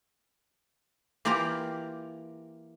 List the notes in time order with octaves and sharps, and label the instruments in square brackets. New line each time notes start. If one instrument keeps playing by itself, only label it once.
[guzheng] E3 A#3 F4 G4 A#4 A#5